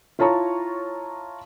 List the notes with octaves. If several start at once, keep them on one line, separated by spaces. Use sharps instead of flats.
E4 F4 C#5 A5 A#5 C#6